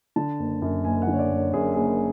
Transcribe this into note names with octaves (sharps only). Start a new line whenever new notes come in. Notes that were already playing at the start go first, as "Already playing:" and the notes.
D3 A5
F#1
F#2
F#1 G#5
F#5
D3
C#5
D5
F#1
C#5
F#2 G#4
F#1 G#4